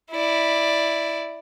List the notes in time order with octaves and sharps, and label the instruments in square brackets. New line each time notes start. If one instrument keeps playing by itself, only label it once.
[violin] E4 D5